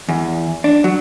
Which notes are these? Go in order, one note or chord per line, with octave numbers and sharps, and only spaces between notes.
E2
D4
F#3